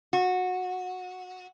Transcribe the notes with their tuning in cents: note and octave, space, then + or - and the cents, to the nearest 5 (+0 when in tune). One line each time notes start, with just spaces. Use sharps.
F#4 -15